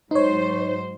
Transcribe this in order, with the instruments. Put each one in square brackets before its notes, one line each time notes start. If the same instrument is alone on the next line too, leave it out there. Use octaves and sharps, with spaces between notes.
[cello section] G#2 F#3 C5 [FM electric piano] D#4 C#5